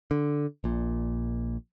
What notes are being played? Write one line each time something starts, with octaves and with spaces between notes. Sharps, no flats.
D3
A#1 A#2